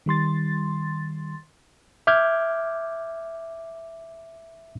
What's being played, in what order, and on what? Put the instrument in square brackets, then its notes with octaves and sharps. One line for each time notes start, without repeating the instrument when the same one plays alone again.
[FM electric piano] D#3 G3 C6 A6
[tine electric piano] E5 D6 F6 G6 G#6